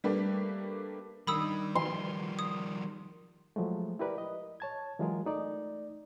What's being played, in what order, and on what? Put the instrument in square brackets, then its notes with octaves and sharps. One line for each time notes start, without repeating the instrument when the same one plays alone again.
[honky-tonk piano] G3 A3 A#3 D4 G4 B4
[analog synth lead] D#3 [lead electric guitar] G3 D4 [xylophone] B5 D#6 E6
[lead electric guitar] F3 G3 [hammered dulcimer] C6
[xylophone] D#6
[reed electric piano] F3 F#3 G#3 A3
E4 G4 A#4 B4 D5
D#5
C#5 A5 G#6
E3 F#3 G#3 F4 G#4 A#4
A3 D#4 D5